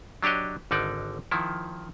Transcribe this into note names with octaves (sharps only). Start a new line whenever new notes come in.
F#3 D4 G4 C#5 D#5
G#1 D3 D#4 D5
D#3 F3 E4